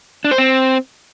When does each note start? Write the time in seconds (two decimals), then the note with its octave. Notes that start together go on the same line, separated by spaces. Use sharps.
0.24 D4
0.31 C5
0.38 C4